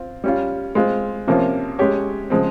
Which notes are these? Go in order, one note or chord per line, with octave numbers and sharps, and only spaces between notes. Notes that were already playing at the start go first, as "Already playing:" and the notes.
Already playing: C4 F4
G3 C#4 F4
G#3 C4 F4
C3 F3 A#3 C#4 F4
G#3 C#4 G4 C#5
C#3 F3 G#3 C4